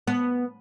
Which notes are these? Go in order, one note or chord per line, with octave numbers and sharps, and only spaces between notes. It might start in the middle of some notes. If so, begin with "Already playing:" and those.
B3